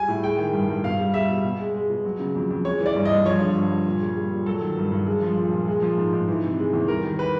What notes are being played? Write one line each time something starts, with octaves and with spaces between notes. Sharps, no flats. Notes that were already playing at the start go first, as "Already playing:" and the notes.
Already playing: G3 G#5
A2
G#3 G5
D#3
G2
G2
B2 F5
G3
G3 E5
B2
B2
G#3
G#3
B2
F#3
C#3
F2
F2
G#3 C#5
E3
D5
G2
D#5
G2
F3 C#5
D3
G2
G2
A#2
G3
G3
A#2
F#3 A4
D#3
G2
G2
G#3
F3
A#2
A#2
G#3
F3
G#2
G#2
E3
C3
G#3
E2
G3 A#4
D#3
B4